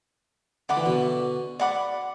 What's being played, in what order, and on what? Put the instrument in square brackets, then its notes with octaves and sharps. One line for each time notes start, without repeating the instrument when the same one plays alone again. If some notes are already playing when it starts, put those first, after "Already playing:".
[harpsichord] D3 [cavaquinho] D5 F#5 B5 D6
[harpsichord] E3
B2 D3
[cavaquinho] D5 F#5 B5 D6